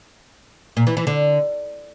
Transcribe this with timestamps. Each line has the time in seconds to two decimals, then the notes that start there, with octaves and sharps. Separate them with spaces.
0.77 A#2
0.87 E3
0.97 E3
1.07 D3